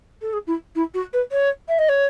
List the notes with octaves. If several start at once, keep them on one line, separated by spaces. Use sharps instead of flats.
A4
G#4
E4
E4
F#4
B4
C#5
E5
D#5
C#5